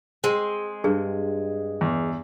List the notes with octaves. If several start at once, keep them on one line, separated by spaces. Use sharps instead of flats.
G#3 C4
G2 G#4
E2